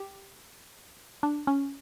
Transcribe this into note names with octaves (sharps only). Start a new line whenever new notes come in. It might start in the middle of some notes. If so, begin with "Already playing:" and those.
Already playing: G4
D4
C#4